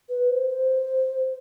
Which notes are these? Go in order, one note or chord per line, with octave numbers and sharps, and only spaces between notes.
B4
C5
C5